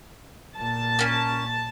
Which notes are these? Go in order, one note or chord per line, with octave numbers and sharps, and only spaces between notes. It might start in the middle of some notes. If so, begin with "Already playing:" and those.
A#2 A5
A#3 C#4